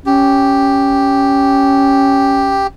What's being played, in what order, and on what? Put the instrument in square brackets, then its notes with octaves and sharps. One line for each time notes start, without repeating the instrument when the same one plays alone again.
[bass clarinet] C#4 [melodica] G4